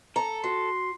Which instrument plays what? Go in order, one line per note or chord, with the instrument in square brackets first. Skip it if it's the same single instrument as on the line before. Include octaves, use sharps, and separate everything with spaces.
[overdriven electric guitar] A4 [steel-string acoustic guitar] A#5
[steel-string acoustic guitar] F#4 [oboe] C6